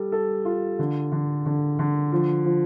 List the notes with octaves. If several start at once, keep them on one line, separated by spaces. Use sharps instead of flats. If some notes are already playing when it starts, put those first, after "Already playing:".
Already playing: G3 A4
A4
F4
D3
D3
D3
D3
F3
F3